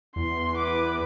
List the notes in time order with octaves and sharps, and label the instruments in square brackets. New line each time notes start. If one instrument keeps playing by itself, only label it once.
[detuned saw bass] E2 [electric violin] C6
[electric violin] B4 D6